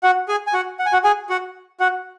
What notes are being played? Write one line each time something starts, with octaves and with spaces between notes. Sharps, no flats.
F#4 F#5
G#4 G#5
G#5
F#4 F#5
F#5
G#5
F#4 F#5
G#4 G#5
F#4 F#5
F#4 F#5